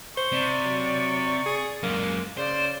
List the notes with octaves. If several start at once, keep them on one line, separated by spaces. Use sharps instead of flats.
C5 C#6
C3 D5
F#3
G#4
F#2 G#3 A#3
C#3 C5 D5